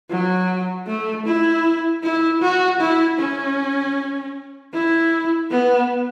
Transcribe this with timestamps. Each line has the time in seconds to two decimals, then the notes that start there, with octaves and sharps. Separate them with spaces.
0.10 F#3
0.87 A3
1.26 E4
2.03 E4
2.41 F#4
2.80 E4
3.19 C#4
4.73 E4
5.50 B3